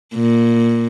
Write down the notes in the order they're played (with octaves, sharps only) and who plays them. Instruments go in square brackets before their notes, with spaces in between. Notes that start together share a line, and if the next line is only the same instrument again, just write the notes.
[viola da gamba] A#2